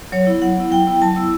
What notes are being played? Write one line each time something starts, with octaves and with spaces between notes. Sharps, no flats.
F#3 C#5
B3 E4
F#3 F#5
B3 E4
F#3 G5
B3 E4
F#3 A5
B3 E4 E6